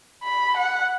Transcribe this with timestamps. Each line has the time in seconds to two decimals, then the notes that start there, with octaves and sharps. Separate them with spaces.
0.24 B5
0.57 F#5